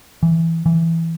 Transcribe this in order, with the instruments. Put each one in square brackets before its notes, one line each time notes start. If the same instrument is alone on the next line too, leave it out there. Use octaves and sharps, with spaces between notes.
[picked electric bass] E3
E3